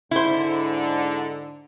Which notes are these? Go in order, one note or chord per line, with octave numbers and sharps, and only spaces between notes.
G#2 D3 E4 C5